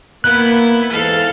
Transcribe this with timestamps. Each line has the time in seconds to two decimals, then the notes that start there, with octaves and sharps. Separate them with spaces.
0.24 A#3 B3 E4 F#6
0.91 E2 G#2 A4 F5